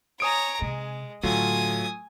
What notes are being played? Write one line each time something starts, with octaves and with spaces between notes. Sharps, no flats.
C#5 G#5 A#5 D#6 D7
C3 G#3
A2 D3 F#3 A3 F4 G#5 D#6